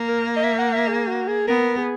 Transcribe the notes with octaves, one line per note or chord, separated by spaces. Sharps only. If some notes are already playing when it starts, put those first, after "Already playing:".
Already playing: A#3
A#4
D#5
E5
F#5
E5
G#4
F#4
G#4
B3 A#4
G#4